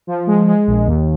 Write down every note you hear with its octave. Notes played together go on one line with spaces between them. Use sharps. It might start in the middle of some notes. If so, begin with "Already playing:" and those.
F3
G#3
G#3
A#1
D#2